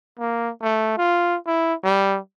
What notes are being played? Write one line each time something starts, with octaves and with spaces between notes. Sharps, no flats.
A#3
A3
F4
E4
G3